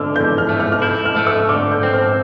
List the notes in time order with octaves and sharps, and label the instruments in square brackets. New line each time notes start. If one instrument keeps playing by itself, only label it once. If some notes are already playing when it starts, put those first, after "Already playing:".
Already playing: [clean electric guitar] D3 [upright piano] E6 F6
[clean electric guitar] E2 [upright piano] G6
[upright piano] F6
[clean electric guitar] A3
[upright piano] F6
F6
[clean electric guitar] E4 [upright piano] G6
[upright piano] F6
[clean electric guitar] A3
[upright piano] E6
[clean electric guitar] D3 [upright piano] D6
[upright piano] G6
[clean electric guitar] C4
[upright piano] F6